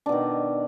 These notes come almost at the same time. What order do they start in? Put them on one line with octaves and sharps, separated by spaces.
D4 B2 D#3